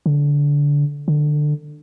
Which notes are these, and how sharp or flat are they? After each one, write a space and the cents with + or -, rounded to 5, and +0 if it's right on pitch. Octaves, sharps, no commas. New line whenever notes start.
D3 -20
D3 +20